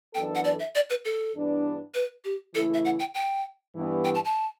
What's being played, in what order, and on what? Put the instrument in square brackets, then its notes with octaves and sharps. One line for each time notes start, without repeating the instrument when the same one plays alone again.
[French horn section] F#2 E3 B3 D4 A4 [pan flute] G5
[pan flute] F#5
D5
E5
D5
B4
A4
[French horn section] G2 E3 B3 D4
[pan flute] B4
G4
[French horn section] C#3 E3 A3 E4 [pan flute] A4
[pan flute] E5
F#5
G5
G5
[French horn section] G2 E3 B3
[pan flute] G5
A5
A5